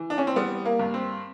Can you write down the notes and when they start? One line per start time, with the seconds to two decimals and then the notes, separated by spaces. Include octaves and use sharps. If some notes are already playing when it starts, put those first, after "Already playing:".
Already playing: E3
0.10 D4
0.18 C#4
0.27 C4
0.36 G3 B3
0.65 A#3
0.79 G2
0.94 C4